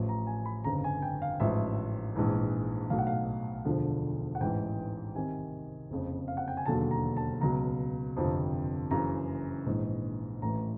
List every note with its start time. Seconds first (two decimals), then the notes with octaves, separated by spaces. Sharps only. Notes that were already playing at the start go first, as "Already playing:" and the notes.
Already playing: A1 A2 F3
0.09 A#5
0.27 G#5
0.45 B5
0.64 G1 F2 C#3 A#5
0.84 G#5
1.02 G5
1.22 F5
1.40 A1 G#2 F3 E5
2.15 A#1 G#2 E3
2.90 B1 A2 F#3 F5
2.98 F#5
3.07 F5
3.65 E1 D2 D3 F3
4.35 F#5
4.40 A1 G#2 E3 G5
5.15 C2 C3 D#3 G#5
5.90 F#1 F2 C#3
6.28 F5
6.37 F#5
6.48 G5
6.57 G#5
6.66 E1 D#2 D3 F#3 A5
6.91 A#5
7.17 A5
7.41 C#2 B2 F#3 A#5
8.16 G1 F2 C3 F3
8.91 F#1 F#2 C#3 E3 A#5
9.66 A#1 G#2 E3
10.42 A1 A2 E3 A#5